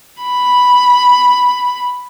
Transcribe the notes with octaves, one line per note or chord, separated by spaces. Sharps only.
B5